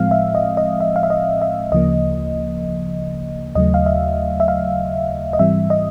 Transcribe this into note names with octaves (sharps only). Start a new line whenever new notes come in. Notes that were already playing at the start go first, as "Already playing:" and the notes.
Already playing: A2 F3 G#3 C4 F5
E5
D#5
D#5
E5
F5
E5
D#5
E5
D2 C#3 F3 A#3 D#5
D#2 C#3 F#3 A3 D#5
F5
E5
E5
F5
D#5
G#2 E3 G3 C4 E5
D#5